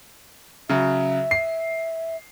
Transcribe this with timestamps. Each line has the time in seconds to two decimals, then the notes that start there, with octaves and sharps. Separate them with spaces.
0.69 C#3 F#3 E5
1.31 C7